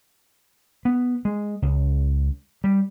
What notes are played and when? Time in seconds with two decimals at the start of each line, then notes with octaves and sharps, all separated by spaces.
0.85 B3
1.25 G#3
1.62 C#2
2.64 G3